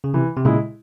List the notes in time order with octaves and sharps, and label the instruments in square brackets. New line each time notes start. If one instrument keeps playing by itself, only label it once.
[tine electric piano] C#3
[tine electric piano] C3 [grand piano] E3
[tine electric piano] C3
[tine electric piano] A#2 C#3 [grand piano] G#3 E4